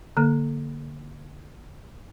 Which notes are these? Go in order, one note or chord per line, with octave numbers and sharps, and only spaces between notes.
D3 A#3